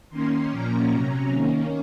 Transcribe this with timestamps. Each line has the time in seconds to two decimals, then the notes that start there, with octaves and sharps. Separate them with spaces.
0.10 D#3 A#3 C#4 C6
0.50 A#2 F3 A#3 C#4 A#5
0.91 C3 F#3 C#4 A#5
1.32 D#3 A#3 C#4